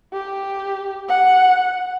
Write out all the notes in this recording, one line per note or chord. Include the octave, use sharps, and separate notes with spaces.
G4
F#5